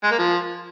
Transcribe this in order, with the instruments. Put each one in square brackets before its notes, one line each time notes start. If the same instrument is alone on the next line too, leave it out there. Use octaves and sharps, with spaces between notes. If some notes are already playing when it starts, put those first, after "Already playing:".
[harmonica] G#3
A#3
F3